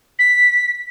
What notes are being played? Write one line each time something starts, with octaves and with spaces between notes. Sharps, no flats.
B6